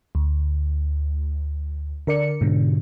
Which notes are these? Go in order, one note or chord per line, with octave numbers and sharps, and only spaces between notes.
D2
D3 A#4 D5 C#7
G#2 B2 D3